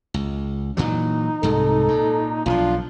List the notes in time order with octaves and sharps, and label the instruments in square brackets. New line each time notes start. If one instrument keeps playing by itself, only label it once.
[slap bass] C#2
[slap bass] A#2 E3 F#3 [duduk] D#4
[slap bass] C2 G#2 C3 [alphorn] A4
[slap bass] A#2
[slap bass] B1 D#3 F3 [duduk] D4 [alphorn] F4